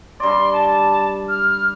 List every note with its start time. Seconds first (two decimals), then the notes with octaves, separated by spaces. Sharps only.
0.20 G2 D5 C6
0.53 A5
1.29 F6